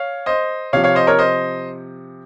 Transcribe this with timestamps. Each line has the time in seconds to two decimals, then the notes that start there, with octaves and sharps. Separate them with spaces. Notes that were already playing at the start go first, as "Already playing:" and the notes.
Already playing: C#5 F5
0.26 C5 D#5
0.73 C3 C#5 F5
0.76 F3
0.84 C#5 F5
0.95 C5 D#5
1.07 A#4 C#5
1.19 C5 D#5